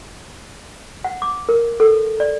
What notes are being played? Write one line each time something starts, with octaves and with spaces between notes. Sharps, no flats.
F#5
D6
A#4
A4
D5